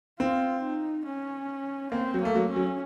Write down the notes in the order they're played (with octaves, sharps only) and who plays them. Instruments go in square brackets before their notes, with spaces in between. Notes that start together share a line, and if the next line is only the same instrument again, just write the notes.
[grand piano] C4 [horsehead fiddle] F4
[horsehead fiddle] D#4
C#4
[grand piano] A#3 [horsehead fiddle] C4
[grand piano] F#3
[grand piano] A3 [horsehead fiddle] A#3
[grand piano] F#3
[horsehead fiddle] C#4
[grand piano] F#3